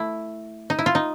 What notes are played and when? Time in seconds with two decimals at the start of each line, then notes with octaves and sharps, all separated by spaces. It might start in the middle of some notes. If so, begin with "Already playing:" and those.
Already playing: A3 E4
0.70 D#4
0.79 E4
0.86 F4
0.95 D#4